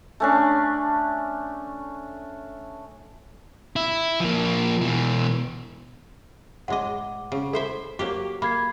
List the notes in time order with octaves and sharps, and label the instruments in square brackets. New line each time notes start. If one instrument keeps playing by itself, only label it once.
[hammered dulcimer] A3 C#4 D4
[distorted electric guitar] E4
F3 A#3
B2 E3
[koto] A2 G#3 D#5 [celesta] F#5 D6
[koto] C#3
[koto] E4 C5 E5 [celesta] A4
[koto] F#3 A#3 G4
[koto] A#3 [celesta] B5 G#6 C7